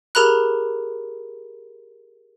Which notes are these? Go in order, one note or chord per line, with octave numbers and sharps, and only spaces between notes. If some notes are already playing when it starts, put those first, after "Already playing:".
G4 G#4 A#4 A#5 B5 F#6